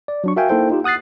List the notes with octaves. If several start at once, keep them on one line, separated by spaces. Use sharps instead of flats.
D5
F#3 D4 C#6
F#4 A#4 E5 F5 G5 G#5
A#3 D#4 E4 A4 C5 G5
D#4 F4 G4
F#5 D#6 F#6 A6 C7